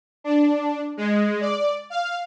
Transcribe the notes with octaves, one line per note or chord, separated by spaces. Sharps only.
D4
G#3
D5
F5